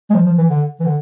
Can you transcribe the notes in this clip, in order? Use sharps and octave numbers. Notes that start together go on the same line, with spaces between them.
G#3
F3
F3
E3
D3
E3
D3